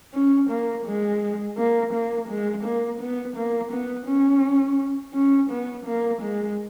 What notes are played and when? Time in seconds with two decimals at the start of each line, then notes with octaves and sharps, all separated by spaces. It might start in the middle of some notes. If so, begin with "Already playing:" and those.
0.14 C#4
0.50 A#3
0.86 G#3
1.58 A#3
1.93 A#3
2.29 G#3
2.64 A#3
3.00 B3
3.36 A#3
3.72 B3
4.07 C#4
5.14 C#4
5.50 B3
5.86 A#3
6.22 G#3